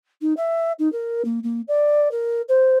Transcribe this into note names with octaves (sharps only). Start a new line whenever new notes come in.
D#4
E5
D#4
A#4
A#3
A#3
D5
A#4
C5